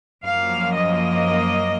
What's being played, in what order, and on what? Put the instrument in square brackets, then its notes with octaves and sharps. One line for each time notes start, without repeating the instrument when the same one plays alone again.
[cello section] F#2 F3 A#3 F5
D#5